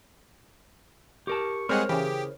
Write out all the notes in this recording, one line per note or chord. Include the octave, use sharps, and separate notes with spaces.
G4 A#4 A5 C#6
G3 G#3 C4 G#4 A#4 C5 C#5 F#5
C#3 E3 G4 G#4